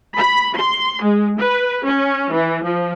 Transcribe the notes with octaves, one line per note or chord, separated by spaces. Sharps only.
B5
C6
G#3
B4
C#4
E3
F3